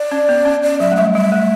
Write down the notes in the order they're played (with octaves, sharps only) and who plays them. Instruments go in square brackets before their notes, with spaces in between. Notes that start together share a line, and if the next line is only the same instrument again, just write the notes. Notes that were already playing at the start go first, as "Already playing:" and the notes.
Already playing: [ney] D5
[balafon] C#4
B3
C#4
[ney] D5
[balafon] F#3 [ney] E5
[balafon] A3
[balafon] G3 [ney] E5
[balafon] G3 [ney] E5
[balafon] A3